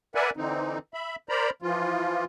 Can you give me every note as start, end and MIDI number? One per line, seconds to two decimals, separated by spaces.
0.15 0.30 70
0.15 0.30 71
0.15 0.30 74
0.15 0.30 76
0.15 0.30 78
0.15 0.30 80
0.37 0.78 50
0.37 0.78 52
0.37 0.78 60
0.37 0.78 63
0.94 1.16 76
0.94 1.16 83
1.29 1.50 70
1.29 1.50 72
1.29 1.50 74
1.29 1.50 82
1.29 1.50 83
1.62 2.24 52
1.62 2.24 53
1.62 2.24 65